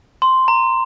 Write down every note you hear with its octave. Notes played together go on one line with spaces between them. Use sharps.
C6
A#5